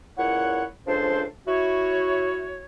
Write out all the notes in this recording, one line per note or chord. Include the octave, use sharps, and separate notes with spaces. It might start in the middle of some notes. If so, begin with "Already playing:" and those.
C#2 A#2 E4 C#5 F#5
C#2 F3 D4 A4 C5
E4 F#4 C#5